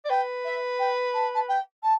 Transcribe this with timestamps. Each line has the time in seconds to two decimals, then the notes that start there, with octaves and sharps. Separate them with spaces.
0.05 D5
0.10 B4 G5
0.45 E5
0.79 G5
1.14 A5
1.35 A5
1.48 G5
1.83 A5